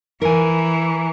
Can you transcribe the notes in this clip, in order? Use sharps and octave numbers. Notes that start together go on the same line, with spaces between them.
E3 A#4 G#5